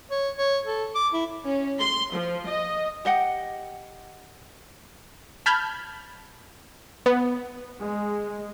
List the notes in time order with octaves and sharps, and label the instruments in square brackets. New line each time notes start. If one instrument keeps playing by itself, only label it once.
[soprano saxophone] C#5
C#5
A4
D6
E4
[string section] C#4
C6
F3
D#5
[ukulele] G4 D#5 F#5 G5
[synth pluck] A5 B5 F6 G6 G#6
B3
[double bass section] G#3